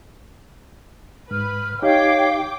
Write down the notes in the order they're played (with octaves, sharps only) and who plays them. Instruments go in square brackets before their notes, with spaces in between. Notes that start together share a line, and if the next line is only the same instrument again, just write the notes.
[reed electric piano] G#2 [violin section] B4 [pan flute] F6
[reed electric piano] D#4 G4 [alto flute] C#5 [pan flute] F5 [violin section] G5 D6